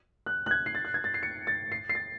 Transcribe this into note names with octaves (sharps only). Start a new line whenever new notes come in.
F#6
F#6
G#6
C7
A6
F#6
G#6
A6
C7
C#7
A6
C7
C7
A6